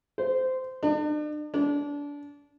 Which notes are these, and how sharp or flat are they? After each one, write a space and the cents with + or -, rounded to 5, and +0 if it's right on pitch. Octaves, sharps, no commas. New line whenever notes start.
C5 -15
D4 +40
D4 -25